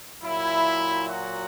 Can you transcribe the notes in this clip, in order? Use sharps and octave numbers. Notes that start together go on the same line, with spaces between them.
A#2 F#3 E4
F#4